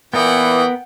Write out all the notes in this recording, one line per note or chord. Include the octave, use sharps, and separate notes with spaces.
A#2 E3 B3 A#4 B4 F#5 G5 D#6